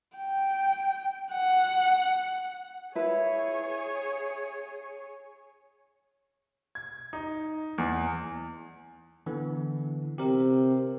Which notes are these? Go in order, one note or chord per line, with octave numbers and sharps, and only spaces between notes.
G5
F#5
E4 G#4 B4 C#5
G#6
D#4
E2
D3 E3 B3
C3 G4 A#4